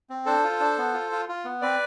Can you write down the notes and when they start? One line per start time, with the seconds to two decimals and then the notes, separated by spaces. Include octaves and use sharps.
0.10 C4
0.26 D4 A4 C5
0.44 F4
0.60 D4
0.78 B3
0.94 F4
1.12 F4
1.29 F4
1.45 B3
1.62 C4 B4 D5